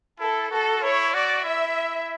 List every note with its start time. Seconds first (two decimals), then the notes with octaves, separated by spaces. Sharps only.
0.20 E4 A4
0.51 F#4 A4
0.82 E4 C#5
1.13 F#4 D5
1.44 E4 E5